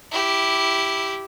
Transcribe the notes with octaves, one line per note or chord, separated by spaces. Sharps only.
E4 G4